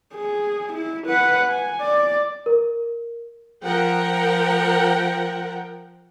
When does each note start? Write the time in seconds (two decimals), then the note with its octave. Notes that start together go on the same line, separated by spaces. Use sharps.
0.15 G#4
0.74 E4
1.08 B4 F#5
1.49 G#5
1.81 D5
2.46 A#4
3.64 F3 A#4 F#5 G5